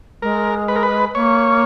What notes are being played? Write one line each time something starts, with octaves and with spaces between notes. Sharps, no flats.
G#3 A#4
B4
A#4
B4
A#3 C#5